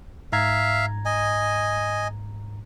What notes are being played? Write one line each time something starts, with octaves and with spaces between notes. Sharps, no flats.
G#2 E5 F5 A#5 G#6
D#5 G#5